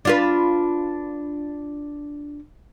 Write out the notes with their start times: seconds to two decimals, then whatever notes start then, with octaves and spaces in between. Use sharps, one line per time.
0.05 D4 F4 B4